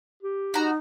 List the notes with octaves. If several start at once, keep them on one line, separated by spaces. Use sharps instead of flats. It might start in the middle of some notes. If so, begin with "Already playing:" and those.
G4
D#4 F#4 A#5